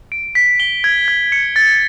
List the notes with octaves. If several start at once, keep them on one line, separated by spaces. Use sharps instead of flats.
D7
B6
G7
G#6
G#6
C#7
A6